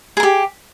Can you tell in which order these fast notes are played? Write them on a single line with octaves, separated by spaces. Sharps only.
G#4 A#4 G4